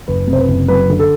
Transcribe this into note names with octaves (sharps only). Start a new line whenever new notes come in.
F#1 B4
C3
C5
B4
F#1
F#3 B4
D3
A4